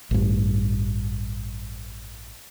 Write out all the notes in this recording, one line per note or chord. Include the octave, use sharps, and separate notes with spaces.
A1 G2